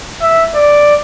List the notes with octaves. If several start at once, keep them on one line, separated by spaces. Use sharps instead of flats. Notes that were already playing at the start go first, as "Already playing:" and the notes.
E5
D5